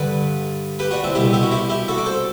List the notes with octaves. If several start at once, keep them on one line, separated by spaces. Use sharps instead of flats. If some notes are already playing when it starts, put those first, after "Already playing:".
Already playing: G2 D3 B4 D5
G4 B4
D4 F#4
C4 E4
C2 B2 E4 G4
E4 G4
F#4
E4 G4
E4 G4
F#4 A4
D5
A4 C5